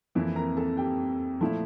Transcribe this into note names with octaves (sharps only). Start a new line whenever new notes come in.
F2 E3 A#3 E4
A#4 A#5
A4 A5
G4 G5
A#2 F3 A3 E4